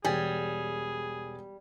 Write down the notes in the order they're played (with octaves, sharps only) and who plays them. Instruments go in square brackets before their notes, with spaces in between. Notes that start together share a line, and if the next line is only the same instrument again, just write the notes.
[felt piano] E1 G#5 [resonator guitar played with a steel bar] G3 [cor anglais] G#4